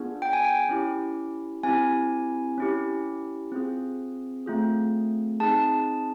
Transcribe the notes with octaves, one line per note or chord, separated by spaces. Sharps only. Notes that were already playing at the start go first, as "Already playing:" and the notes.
Already playing: B3 D4 F4 G#4
G5
G#5
G5
C#4 E4 G4
C4 E4 G4 G#5
C#4 E4 G4
C4 F4 G#4
A3 C4 F4 G#4
C4 D#4 G#4 A5